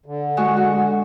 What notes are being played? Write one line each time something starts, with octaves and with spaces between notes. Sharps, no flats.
D3
G#3 F#4
F#4